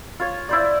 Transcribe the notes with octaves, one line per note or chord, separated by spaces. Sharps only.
F4 C#5
E4 C5 D5